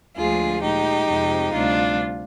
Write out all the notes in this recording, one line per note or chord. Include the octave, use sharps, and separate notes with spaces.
D2 D3 F3 G#3 F4 G#4
A#2 G#3 D#4 G4
F2 C3 F3 G#3
D2 C3 G3 D4 F4